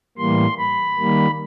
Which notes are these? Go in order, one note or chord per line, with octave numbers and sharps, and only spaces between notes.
A2 E3 G3 A#3 C6
B5
D#3 G3 A#3